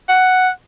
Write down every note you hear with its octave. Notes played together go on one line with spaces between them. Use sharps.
F#5